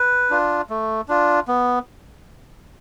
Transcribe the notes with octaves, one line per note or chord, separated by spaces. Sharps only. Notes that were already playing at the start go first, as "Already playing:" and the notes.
Already playing: B4
D4 F4
A3
D4 F4
B3